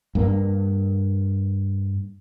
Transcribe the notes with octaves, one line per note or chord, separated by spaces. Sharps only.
G2 A#3